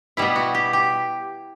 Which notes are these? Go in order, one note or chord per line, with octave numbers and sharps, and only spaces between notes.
B2 G3 B3 E4
F#4
G4
G4